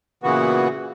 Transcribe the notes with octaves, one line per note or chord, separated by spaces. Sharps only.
A#2 C#3 E3 B3 F#4